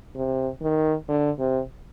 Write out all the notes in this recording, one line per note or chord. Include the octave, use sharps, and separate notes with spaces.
C3
D#3
D3
C3